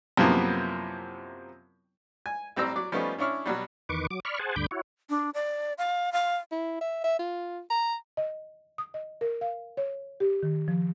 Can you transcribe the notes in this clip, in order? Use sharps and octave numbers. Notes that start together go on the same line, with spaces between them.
F#2 C3 F3 A#3 B3 E4
G#5
A1 G3 C4 C5 A#5 E6
F#3 D5
F3 G3 A3 B3 C#4 D#4
C#4 D4 E4 C#5 F6
B2 F#3 G3
E2 D#3 B4 C#6 D6
F#3 D6
D5 B5 C#6 F6
G#4 C5 F#5 G#5 A5
D2 G2 D3 B5 D6 G6
E4 F#4 C#5
D4
D5
F5
F5
E4
E5
E5
F4
A#5
D#5
D#6
D#5
A#4
F5
C#5
G4
D#3
F3